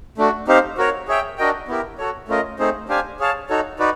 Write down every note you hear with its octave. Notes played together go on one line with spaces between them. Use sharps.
A3 D4 F#4
C4 D#4 G4 C5 F5
F#4 A#4 C#5
G#4 C#5 E5 G5
D4 F#4 A#4 D#5 G5
B3 E4 G4 A#4
F#4 A4 C#5
A3 C#4 F4 A#4 D#5
A3 C4 D#4 G#4 C5
D4 G4 C5 F5 G#5
G#4 C#5 F5 A5
D#4 F#4 A4 C#5
D#4 F#4 B4 D5